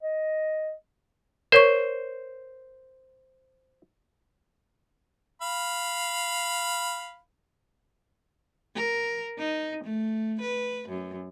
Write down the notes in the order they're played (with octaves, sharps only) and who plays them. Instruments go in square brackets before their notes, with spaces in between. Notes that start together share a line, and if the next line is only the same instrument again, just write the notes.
[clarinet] D#5
[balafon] A#4 C#5 C#6 [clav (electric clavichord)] C5
[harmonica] F5 B5
[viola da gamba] A#4
D#4
A3
B4
F#2